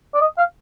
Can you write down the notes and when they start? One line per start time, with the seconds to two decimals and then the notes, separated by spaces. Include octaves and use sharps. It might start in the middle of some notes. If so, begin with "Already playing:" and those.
0.15 D5
0.21 D#5
0.38 F5